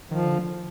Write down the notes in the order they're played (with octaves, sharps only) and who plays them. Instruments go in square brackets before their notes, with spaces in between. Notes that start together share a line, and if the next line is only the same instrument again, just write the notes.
[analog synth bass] D#3 [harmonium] F3
[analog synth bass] D3